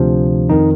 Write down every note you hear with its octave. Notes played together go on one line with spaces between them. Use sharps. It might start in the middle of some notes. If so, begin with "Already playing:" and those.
Already playing: D2 C3 F3 D4
F2 D#3 D#4